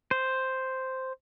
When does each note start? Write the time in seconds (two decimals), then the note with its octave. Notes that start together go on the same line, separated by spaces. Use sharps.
0.11 C5